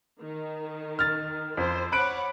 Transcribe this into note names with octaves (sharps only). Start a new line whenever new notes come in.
D#3
F6 A6
F2 C5
C#5 F#5 B5 D6 F#6 D7